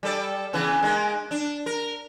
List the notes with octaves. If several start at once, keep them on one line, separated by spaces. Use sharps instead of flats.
G3 A4 D5
C#3 E3 B3
G#3 A#3 D#4
D4
A#4